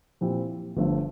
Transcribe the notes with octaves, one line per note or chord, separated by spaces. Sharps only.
A#2 F3 C4 E4 G4
G1 G2 F3 A3